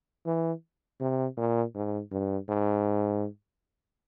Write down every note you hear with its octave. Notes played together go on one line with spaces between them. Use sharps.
E3
C3
A#2
G#2
G2
G#2